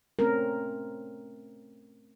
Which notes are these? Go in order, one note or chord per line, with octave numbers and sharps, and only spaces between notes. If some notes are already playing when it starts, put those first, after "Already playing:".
A3 C4 C#4 A#4